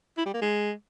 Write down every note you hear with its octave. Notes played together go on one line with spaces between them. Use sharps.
E4
G3
A#3
G#3